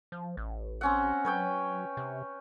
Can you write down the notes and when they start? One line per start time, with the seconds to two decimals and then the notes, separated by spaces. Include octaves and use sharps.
0.12 F3
0.37 A1
0.81 C4 C#4 F#5
1.25 F#3 B4 C#5 G5
1.97 C3